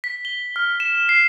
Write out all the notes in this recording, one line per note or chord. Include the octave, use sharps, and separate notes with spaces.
B6
G7
F6
E7
C7